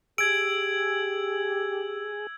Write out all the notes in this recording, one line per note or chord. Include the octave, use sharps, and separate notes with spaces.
G4 G#4 E6 G#6 D7 F#7